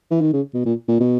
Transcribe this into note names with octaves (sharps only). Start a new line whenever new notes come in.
E3
D#3
C#3
B2
A#2
A#2
B2